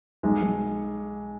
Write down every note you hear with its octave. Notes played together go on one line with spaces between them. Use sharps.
B1 G#3
B1